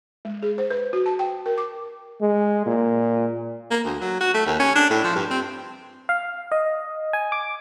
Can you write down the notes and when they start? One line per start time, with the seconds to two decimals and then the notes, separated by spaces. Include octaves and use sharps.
0.25 G#3
0.43 G#4
0.58 C5
0.70 B4
0.93 F#4
1.06 A5
1.19 G5
1.46 A#4
1.58 D6
2.21 G#3
2.66 A#2
3.71 A#3
3.84 D2
4.01 F#3
4.20 F#4
4.34 A3
4.46 D#2
4.60 C#4
4.76 D4
4.90 A2
5.04 F3
5.15 G2
5.30 C4
6.09 F5
6.52 D#5
7.13 G#5
7.32 D6